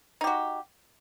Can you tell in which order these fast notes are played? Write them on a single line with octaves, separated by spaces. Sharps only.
D#4 G4 F#4